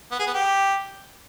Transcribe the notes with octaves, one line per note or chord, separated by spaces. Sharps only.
B3
G#4
B3
G4